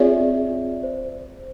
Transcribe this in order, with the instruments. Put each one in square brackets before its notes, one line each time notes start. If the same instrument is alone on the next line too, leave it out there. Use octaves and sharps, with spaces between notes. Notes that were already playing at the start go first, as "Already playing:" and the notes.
Already playing: [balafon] C4 F4 G#4 C#5 [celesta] D5 E5
[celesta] C5